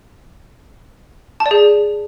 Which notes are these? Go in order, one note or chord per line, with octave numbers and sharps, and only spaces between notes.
A5
D5
G#4